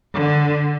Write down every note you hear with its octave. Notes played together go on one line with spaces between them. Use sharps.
D3